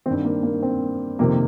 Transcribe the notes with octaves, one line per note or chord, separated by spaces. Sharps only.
G2 D#3 C4
A#3
A#3
C4
F2 C3 D#3 A#3